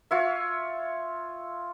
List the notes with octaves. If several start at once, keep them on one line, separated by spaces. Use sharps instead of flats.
F4 C#5 E5